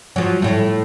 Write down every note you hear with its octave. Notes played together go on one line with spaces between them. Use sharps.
F3 F#3
A2 A3